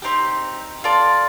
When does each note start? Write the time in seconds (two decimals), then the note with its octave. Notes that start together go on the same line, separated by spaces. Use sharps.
0.02 C4 D#4 G4
0.84 F4 A4 D5